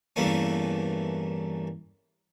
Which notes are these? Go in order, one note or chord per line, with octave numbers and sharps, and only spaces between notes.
E2 G2 E3 A3 A#3 C#4